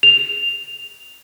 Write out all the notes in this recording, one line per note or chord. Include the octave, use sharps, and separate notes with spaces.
F7